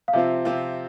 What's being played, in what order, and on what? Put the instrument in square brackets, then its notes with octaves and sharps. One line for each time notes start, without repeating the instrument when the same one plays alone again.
[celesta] F5
[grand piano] C3 F3 C4 F4 [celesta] E5
[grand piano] C3 F3 C4 F4